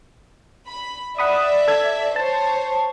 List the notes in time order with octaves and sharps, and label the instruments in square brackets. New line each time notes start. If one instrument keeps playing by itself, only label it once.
[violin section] B5
[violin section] D5 E5 [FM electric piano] F#5 B5 D#6
[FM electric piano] A4 G#6
[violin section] C5 C#5 [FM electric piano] A5